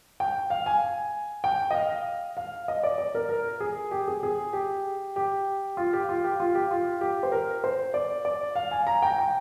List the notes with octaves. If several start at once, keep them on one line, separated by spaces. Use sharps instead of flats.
G5
F5
G#5
G5
D#5
F5
F5
D#5
D5
D5
A#4
A#4
G#4
G4
G#4
G#4
G4
G4
F4
G4
F4
G4
F4
G4
F4
G4
C5
A#4
C5
D5
D5
F5
G#5
A#5
G5
G5